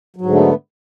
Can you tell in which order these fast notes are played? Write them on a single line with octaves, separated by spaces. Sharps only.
F#3 G#2 D3 A3 B3